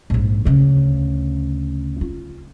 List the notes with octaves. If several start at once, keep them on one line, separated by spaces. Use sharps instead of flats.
A#1 G#2
D2 C#3
F4